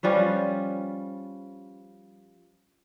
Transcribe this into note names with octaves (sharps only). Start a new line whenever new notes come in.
F3 G3 C#4 B4